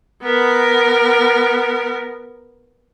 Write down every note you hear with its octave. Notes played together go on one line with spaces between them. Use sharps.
B3 A#4